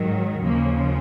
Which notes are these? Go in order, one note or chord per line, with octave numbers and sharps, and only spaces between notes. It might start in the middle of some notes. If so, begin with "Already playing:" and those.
Already playing: G#2 D#3 F#3
D#2 C#3 F3 A#3